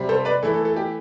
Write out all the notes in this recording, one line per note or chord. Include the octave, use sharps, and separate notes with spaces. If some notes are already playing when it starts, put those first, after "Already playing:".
Already playing: C3 G3 C4
A4 C5
B4 D5
E3 A3 E4 A4
A4
A4
G4